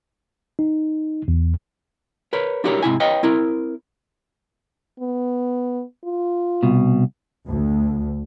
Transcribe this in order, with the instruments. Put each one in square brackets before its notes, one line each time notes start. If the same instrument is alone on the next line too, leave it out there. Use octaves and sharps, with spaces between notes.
[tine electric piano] D#4
E2
[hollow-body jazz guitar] A#4 B4 C#5
D4 E4 F#4 G4 A#4 C#5
G#2 C3 E4 G#5
B4 C#5 D#5 G5
C4 E4 A#4
[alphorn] B3
F4
[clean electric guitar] C2 B2
[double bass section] D2